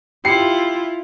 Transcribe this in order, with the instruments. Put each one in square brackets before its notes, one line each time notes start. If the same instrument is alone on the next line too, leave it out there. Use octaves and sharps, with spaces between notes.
[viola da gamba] E4 F4 [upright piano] G4 C7 C#7